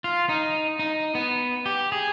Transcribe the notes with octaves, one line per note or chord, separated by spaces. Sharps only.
F4
D#4
D#4
B3
G4
G#4